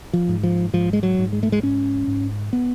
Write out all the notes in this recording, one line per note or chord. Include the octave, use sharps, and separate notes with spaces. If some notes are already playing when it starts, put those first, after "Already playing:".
F3
G#2
F3
G#2 F3
G#3
F#3
G#2
G#3
A3
G#3
G#2 C#4
G#2
B3